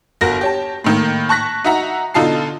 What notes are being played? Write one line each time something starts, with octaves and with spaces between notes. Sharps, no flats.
G1 F#4 A#4 A#6
G4 C#5 A5
A2 D#3 A#3
A5 C#6 F#6 A#6 B6
D#4 F#4 E5 F#5 A#5
B2 D3 D#4 F4 A5 C7